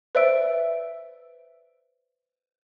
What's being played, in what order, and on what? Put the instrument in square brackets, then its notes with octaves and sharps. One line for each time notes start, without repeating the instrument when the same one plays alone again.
[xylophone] B4 C5 D5 E5 E6 D7